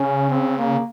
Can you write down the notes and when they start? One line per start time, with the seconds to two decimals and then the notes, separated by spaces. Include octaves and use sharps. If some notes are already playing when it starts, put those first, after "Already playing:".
Already playing: C#3 C#4
0.30 C4
0.58 A#3